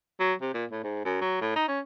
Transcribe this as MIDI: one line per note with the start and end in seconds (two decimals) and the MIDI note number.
0.20 0.34 54
0.41 0.53 48
0.54 0.65 46
0.71 0.82 45
0.84 1.03 44
1.05 1.18 42
1.21 1.41 54
1.41 1.52 45
1.56 1.66 63
1.68 1.80 61